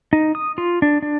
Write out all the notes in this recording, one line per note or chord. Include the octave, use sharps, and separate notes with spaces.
D#4
D#6
F4
D4
D4